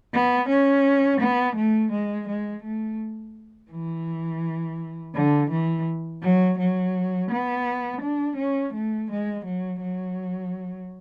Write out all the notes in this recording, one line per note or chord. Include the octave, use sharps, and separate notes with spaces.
B3
C#4
B3
A3
G#3
G#3
A3
E3
D3
E3
F#3
F#3
B3
D4
C#4
A3
G#3
F#3
F#3